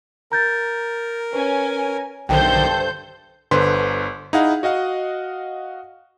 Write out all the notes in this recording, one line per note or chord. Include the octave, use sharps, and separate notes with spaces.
A#4 A#5 G6 A6
C#4 B4 G#5
B1 G2 D3 D#3 A4 C5 G5 G6
G1 D3 B4 C5 C6
D#4 E4 G#4 F5 F#5
F#4 D#5 F5 F#5